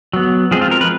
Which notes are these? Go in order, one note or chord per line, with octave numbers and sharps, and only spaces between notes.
F#3 B3
F3 G#3 C4 G#4
F4
A#4
B4